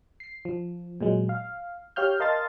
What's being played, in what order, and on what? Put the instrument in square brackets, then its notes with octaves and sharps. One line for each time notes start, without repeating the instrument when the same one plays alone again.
[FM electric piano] C7
F3
A#2 F#3 G#3
F5
G4 C#5 F5 F6 G6
A#4 D#5 F5 A5 C6 A6